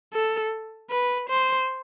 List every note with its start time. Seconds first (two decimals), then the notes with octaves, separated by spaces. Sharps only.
0.13 A4
0.91 B4
1.30 C5